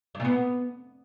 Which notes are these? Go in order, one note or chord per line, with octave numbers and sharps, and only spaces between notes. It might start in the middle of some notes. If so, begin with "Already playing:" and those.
G2
A#2
B3